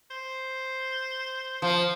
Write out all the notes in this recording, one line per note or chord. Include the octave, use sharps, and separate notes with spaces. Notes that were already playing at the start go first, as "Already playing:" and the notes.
C5
F3